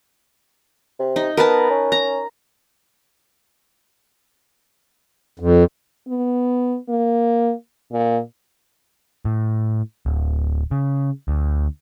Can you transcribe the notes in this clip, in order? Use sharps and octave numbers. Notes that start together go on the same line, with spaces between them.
C3
D#4
B3 A#4 B4 A5
C#4
A#5
F2
B3
A#3
A#2
A2
D1
C#3
D2